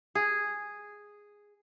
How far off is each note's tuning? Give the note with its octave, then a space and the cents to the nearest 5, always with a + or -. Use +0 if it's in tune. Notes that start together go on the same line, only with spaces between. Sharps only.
G#4 -5